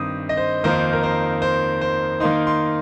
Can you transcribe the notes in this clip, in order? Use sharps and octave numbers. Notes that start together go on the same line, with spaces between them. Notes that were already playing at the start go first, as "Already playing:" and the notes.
Already playing: G2 D#3 C4 D#6
D#5
C5
F2 D#3 A#3 D#4 C5
A#4
C5
C5
C5
D#3 A#3 D#4 C6
C6